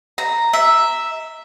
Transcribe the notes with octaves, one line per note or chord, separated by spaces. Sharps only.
A#5
E5